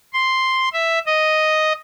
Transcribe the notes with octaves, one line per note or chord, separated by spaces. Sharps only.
C6
E5
D#5